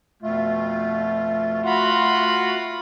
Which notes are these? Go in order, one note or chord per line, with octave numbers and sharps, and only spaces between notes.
F2 B2 A3 F4
F4 F#4 F#5 B5